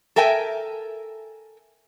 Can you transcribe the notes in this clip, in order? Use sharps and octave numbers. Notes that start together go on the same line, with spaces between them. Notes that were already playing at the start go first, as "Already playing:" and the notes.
A4 A#4 E5 G5 G#5